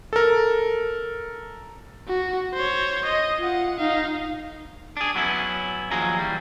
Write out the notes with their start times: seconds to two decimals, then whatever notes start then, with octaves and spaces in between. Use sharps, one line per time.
0.13 A4 A#4
2.08 F#4
2.54 C5 C#5
3.05 D#5
3.39 F4 F#5
3.78 D#4 F5
4.97 D4 G#4
5.15 F#3 B3 C#4 E4
5.91 D#2 F3 F#3 G#4 A#5
6.19 E3 G3